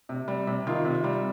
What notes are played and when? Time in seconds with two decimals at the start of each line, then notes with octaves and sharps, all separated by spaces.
0.09 C3
0.28 G3
0.47 C3
0.67 D#3 F4
0.85 C3
1.04 G3